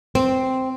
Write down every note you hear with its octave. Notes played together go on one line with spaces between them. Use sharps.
C4